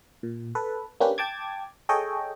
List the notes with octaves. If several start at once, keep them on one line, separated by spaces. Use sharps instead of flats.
A#2
A4 B4
A#3 C#4 D4 G4 B4
G5 A5 D6 G#6
G#4 A4 C#5 D#5 G5